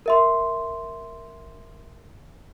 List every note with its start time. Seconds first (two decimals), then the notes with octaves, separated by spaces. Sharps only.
0.06 A#4 E5 C6